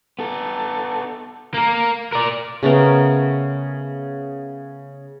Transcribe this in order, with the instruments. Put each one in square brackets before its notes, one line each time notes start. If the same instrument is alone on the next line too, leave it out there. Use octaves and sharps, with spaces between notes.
[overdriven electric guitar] B3 A4
A#3 A#4
A#4 D5
[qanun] C#3 A3 B3 A#4